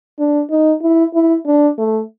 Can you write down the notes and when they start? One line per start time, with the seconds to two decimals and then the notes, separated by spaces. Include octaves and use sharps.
0.19 D4
0.50 D#4
0.82 E4
1.14 E4
1.46 D4
1.78 A3